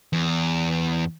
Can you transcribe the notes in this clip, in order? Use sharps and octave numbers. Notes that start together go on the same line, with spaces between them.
E2